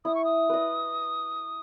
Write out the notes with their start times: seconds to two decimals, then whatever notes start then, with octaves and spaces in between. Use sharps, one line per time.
0.05 E4 D#6
0.15 C#6
0.25 D#6
0.49 B4 D#5